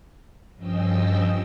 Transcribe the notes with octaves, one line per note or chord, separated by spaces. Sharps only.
G2 F3 C#4 D#5 G5 E6